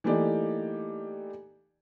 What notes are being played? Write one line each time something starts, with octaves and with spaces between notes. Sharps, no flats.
E3 A3 A#3 D#4 G4 D5